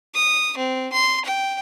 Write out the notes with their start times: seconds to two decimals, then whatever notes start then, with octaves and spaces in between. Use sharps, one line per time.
0.15 D#6
0.57 C4
0.93 C6
1.25 G5